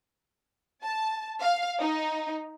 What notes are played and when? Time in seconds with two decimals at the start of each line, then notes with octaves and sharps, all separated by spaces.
0.83 A5
1.40 F5
1.79 D#4